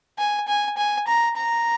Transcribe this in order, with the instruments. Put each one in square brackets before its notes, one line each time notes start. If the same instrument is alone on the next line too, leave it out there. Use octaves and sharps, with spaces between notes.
[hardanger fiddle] G#5
G#5
G#5
A#5
A#5